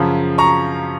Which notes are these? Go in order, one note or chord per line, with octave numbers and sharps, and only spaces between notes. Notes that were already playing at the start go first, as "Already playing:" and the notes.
Already playing: F#2 C#3 F3
A#5 C#6